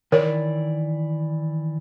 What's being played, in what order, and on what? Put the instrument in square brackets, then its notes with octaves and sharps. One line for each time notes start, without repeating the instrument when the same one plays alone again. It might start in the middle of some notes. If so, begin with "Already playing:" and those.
[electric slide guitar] D#3 E3 D5 [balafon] A#4 C#5